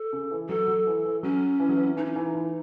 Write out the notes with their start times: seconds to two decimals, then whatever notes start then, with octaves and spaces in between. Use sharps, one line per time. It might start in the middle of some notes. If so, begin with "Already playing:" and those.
Already playing: A4
0.13 C#3
0.31 E3
0.49 F#3 A4
0.68 F#3
0.87 E3
1.05 E3
1.23 F#3 C#4
1.60 E3
1.69 F#3
1.77 E3
1.97 E3 D#4
2.05 C#4
2.12 E3 D#4
2.34 E3